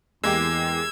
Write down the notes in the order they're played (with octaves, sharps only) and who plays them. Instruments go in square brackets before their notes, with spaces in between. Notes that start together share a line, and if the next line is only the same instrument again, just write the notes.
[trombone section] E2 [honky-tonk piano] G#3 A#3 G4 [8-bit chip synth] E6 G#6